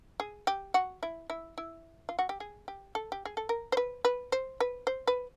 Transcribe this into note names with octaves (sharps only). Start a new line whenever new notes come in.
G#4
G4
F#4
E4
E4
E4
F4
F#4
G4
G#4
G4
A4
G4
G#4
A4
A#4
C5
B4
B4
C5
B4
C5
B4